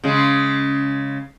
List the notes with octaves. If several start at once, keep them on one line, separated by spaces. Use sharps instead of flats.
C#3 G#3